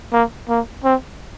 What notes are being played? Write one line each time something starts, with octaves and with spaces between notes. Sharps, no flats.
A#3
A#3
C4